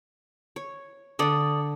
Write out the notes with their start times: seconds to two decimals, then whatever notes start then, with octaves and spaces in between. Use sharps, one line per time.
0.56 C#5
1.19 D3 D4 A4 D5 D#6